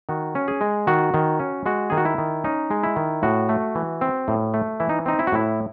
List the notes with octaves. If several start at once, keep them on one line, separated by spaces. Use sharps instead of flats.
D#3 F#4
C#4
G#4
G#3
D#3 F#4
D#3
C#4
G#3 F#4
D#3 G#4
F#4
E4
D#3
C#4 D#4
G#3
E4
D#3
A2 F#4
A3
E3
C4
A2
A3
E3 E4
D#4
C4 D#4
E4
F#4
A2 E4